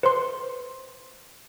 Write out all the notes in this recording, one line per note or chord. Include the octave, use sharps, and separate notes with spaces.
B4 C5 C6